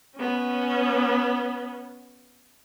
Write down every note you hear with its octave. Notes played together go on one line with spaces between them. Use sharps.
B3 C#4